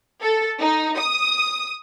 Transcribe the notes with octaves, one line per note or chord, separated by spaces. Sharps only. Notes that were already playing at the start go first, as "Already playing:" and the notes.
A4
D#4
D#6